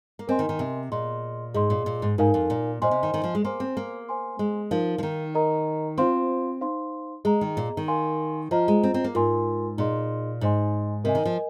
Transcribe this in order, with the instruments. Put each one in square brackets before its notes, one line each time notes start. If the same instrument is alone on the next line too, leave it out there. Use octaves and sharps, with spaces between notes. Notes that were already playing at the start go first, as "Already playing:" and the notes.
[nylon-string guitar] A#3
[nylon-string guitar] C4 [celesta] A#4 D#5 G#5 C6
[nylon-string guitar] D#3
D#3
C3
[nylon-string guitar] A#2 [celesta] G#4 D#5 C6
[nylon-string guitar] G#2 [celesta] G#4 D#5 C6
[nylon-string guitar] A#2
A#2
G#2
[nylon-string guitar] G#2 [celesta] D#4 A#4 F5 G#5
[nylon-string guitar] F2
A#2
[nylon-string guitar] A#2 [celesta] C5 D#5 G#5 C6
[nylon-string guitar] C3
D#3
D#3
F3
G#3
[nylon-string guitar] A#3 [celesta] C5 G#5 C6
[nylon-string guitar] C4
A#3
[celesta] C5 G#5 C6
[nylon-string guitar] G#3
[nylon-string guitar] F3 [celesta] D#4 A#4 F5
[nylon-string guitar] F3
D#3
[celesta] A#4 D#5 A#5
[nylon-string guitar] C4 [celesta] F4 C5 F5 C6
[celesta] D#4 C5 F5 C6
[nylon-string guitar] G#3 [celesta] G#4 D#5 A#5
[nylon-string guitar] D#3
A#2
D#3
[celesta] A#4 F5 G#5 C6
[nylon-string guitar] F3 [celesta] F4 C5 D#5 A#5
[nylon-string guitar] G#3
C4
C4
A#3
[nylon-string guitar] G#2 [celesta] F4 A#4 G#5 C6
[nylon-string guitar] A#2 [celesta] D#4 G#4 D#5 C6
[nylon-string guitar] G#2 [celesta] D#4 C5 D#5 G#5 C6
[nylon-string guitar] C3 [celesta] A#4 D#5 G#5
[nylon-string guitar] D#3
F3